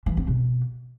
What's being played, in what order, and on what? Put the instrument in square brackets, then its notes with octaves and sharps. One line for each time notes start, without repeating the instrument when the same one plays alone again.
[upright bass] E3
C4
B2